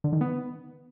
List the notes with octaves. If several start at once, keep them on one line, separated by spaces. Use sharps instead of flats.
D3
D#3
B3